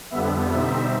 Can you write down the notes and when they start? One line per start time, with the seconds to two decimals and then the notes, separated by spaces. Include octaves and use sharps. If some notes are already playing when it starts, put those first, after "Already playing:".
0.10 F2 D3 G3 B3 E5
0.51 B2 G3 C4 D#4 E5